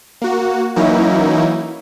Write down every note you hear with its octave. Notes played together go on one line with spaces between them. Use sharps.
A#3 F#4
E3 F#3 A#3 C#4 D#4 E4